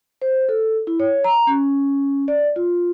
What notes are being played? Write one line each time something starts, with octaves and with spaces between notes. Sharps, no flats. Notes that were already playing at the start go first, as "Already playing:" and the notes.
C5
A4
E4
C#5
A#5
C#4
D5
F4